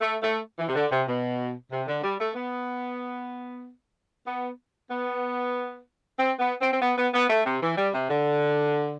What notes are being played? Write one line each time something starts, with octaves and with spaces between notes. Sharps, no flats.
A3
A3
E3
C3
D3
C3
B2
C3
D3
G3
A3
B3
B3
B3
C4
B3
C4
C4
B3
B3
B3
A3
C3
E3
G3
C3
D3